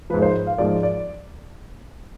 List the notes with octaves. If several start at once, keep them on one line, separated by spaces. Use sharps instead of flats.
G#2 F3 B4
C5
F5
G#2 F3 D5
D5